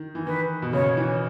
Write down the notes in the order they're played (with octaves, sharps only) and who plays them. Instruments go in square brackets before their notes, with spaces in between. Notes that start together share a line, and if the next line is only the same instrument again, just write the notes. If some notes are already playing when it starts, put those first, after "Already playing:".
Already playing: [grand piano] D#3
E3
[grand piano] D#3 [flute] B4
[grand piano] B2
[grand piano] C#3 [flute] C#5
[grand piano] E3